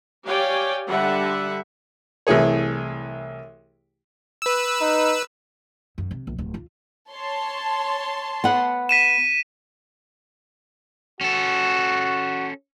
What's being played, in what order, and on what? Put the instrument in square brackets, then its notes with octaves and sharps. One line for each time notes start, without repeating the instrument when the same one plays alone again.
[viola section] G4 C#5 D5 F5 G5 G#5
D3 G3 E5 F#5
[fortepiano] C2 E3 A3 G#4 C#5
[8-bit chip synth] B4 E6
[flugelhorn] D#4
[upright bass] F#2
C3
A#1
D1
F4
[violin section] C#5 A5 C6
[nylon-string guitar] B3 F#5
[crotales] B6 D#7 E7
[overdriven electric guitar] C#4 A4 [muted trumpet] F#4